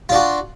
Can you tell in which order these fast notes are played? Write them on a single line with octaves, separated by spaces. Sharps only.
F4 D4 F#4